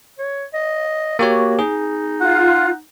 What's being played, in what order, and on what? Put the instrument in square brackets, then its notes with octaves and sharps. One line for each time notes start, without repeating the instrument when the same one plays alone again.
[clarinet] C#5
D#5
[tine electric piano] A#3 G4 C#5 [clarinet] F#4
[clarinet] D#4 [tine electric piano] G#4
[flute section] F4 [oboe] F#5